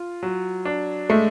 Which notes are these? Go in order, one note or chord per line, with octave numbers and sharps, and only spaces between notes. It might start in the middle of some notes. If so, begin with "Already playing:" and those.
Already playing: F4
F#3
D4
G#3 A3